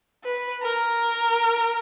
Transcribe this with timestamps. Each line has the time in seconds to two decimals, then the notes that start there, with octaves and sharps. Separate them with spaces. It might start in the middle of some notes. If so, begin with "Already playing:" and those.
0.24 B4
0.63 A#4